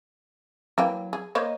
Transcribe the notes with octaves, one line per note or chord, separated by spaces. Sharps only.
E3 F#3 A#3 G5
G#4
A#3 C5 C#5 D#5